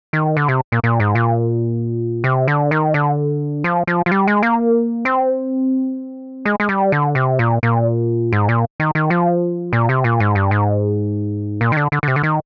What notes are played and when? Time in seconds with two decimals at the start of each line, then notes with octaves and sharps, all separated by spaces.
0.13 D#3
0.37 D3
0.48 C3
0.72 A#2
0.84 A#2
1.00 G#2
1.15 A#2
2.24 C3
2.48 D3
2.71 D#3
2.94 D3
3.64 F3
3.87 F3
4.06 F3
4.11 G3
4.28 G#3
4.43 A#3
5.05 C4
6.45 G#3
6.60 G#3
6.69 G3
6.92 D3
7.15 C3
7.39 A#2
7.63 A#2
8.32 G#2
8.49 A#2
8.80 D#3
8.95 D#3
9.10 F3
9.73 A#2
9.89 C3
10.04 A#2
10.20 G#2
10.35 G2
10.51 G#2
11.61 A#2
11.72 D#3
11.77 D3
11.92 D3
12.03 D3
12.08 C3
12.16 D3
12.23 D#3